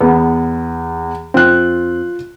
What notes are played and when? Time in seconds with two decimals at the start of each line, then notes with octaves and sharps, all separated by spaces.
0.01 E2 B3
1.34 F2 C4 F4 F#6